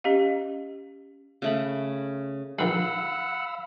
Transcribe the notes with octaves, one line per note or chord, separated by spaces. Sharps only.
C#4 G4 D#5 F5
C#3 A3 B5
A#1 D#3 G#3 F5 F#5 B5 E6